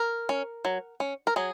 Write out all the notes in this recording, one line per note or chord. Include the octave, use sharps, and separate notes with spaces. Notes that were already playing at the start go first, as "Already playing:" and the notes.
Already playing: A#4
C#4
F#3
C#4
A#4
F#3 G#4